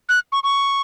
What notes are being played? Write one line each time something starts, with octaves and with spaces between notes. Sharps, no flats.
F#6
C#6
C#6